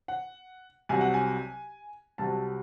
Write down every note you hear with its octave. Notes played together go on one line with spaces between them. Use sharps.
F#5
C2 C3 F#3 G#5
F#5
G#5
C2 C3 F#3 A5